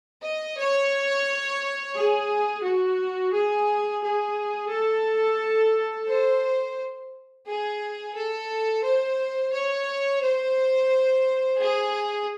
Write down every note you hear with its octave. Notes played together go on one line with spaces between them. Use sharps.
D#5
C#5
G#4
F#4
G#4
G#4
A4
C5
G#4
A4
C5
C#5
C5
G#4